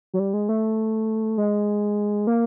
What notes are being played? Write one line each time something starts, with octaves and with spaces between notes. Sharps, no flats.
F#3
G3
G#3
A3
G#3
A#3